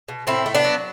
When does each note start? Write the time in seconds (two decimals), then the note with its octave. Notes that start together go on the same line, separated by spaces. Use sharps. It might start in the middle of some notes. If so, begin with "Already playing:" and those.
0.08 B2
0.27 A2 C4 E4
0.46 A3
0.55 B3 D4
0.64 F#3